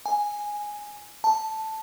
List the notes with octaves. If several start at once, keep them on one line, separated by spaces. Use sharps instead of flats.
G#5
A5